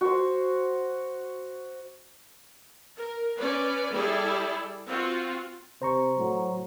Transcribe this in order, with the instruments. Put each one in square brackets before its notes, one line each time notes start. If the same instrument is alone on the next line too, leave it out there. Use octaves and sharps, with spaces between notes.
[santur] F#4 C5
[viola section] A#4
C#4 B4 D5
G3 E4 G#4 A4 D5
C4 F4 F#4
[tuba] C3 [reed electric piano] C5 A#5 C#6
[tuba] A2 [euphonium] F#3